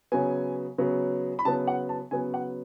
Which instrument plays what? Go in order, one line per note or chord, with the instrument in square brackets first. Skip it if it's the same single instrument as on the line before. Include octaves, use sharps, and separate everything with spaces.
[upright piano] C#3 F#3 B3 G#5
C#3 F#3 B3
B5
C#3 F#3 B3 A5
F#5
A5
C#3 F#3 B3 G#5
F#5